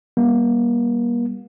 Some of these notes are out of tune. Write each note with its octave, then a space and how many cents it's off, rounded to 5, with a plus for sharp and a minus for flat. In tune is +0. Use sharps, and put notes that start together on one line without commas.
G3 +0 A#3 +40